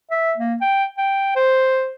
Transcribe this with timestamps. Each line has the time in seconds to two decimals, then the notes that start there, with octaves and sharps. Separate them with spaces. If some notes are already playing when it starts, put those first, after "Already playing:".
0.11 E5
0.37 A#3
0.61 G5
0.98 G5
1.36 C5